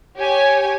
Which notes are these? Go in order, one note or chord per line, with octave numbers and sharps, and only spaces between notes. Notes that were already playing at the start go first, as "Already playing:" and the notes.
G4 C#5 G#5